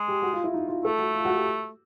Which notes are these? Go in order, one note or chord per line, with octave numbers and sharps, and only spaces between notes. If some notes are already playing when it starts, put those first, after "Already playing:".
Already playing: G#3
G4
F#4
F4
E4
D#4
F4
A3 A4
F#4
F4
F#4
G4